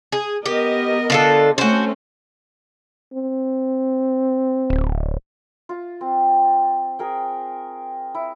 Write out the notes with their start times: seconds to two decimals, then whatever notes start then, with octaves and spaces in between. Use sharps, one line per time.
0.12 G#4
0.46 B3 G4 A#4 D#5
1.10 D3 F4 A4
1.58 A3 C4 C#4 F#4 C5
3.13 C4
4.70 D1
5.69 F4
6.01 C4
6.99 G#4 A#4 G5
8.15 E4